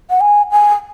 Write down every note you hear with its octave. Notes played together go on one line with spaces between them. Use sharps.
F#5
G#5
G#5